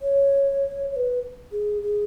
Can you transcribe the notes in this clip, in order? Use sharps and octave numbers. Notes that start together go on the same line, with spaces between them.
C#5
C#5
B4
G#4
G#4